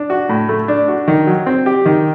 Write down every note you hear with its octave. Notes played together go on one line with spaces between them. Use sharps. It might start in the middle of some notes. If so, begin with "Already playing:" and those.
Already playing: D4
F#4
A2
A3
D4
F#4
D#3
F#3
C4
G4
D#3